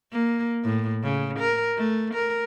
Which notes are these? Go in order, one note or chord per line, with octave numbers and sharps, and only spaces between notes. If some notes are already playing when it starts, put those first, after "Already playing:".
A#3
A2
C#3
A#4
A3
A#4